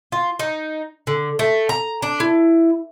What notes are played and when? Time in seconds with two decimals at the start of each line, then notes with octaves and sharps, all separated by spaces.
0.12 F4
0.39 D#4
1.07 D3
1.39 A3
1.69 A#5
2.02 D4
2.20 E4